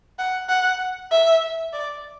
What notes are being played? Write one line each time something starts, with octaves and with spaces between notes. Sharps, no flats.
F#5
F#5
E5
D5